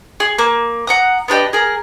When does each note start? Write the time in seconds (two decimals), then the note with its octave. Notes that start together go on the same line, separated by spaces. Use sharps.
0.20 G#4
0.38 A#3
0.87 F#5 A#5 D#6
1.28 B3 D4 G4 D#5
1.53 G#4 A#4